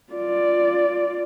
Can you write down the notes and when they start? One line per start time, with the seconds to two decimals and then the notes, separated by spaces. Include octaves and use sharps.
0.13 F4 D5